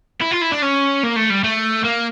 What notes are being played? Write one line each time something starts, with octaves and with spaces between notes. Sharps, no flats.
E4
F4
E4
D4
C#4
A#3
A3
G3
A3
A#3